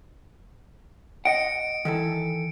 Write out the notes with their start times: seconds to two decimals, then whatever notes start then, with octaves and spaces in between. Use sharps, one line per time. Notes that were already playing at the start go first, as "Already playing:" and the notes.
1.25 D#5 F#5 C#7 D7
1.85 D#3 E3 A4